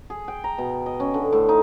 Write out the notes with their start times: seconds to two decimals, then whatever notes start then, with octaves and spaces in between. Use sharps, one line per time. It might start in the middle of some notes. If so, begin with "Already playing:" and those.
0.10 G#4
0.28 G5
0.44 A#5
0.58 B2
0.86 D#5
1.00 C#4
1.14 D3
1.33 A2
1.49 D#4